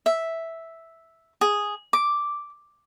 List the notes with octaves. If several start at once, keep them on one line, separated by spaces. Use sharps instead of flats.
E5
G#4
D6